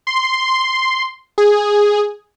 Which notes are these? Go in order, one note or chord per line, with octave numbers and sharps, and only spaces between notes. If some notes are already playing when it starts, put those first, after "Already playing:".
C6
G#4